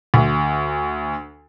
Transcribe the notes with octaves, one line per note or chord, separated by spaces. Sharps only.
D2